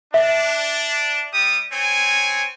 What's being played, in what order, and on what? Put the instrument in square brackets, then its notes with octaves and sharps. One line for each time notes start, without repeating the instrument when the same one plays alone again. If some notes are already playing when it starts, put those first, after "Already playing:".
[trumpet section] D4 [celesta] E5
[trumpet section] G3 G4 D#6
C4 C#5 G#5